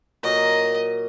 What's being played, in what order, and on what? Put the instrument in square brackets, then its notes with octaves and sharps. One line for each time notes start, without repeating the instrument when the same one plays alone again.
[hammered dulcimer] A#2 F#3 [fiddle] D#5